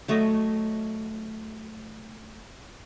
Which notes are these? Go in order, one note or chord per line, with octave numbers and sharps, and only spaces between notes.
F#3 A3 C#5 D#5